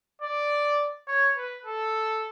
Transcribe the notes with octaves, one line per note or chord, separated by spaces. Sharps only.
D5
C#5
B4
A4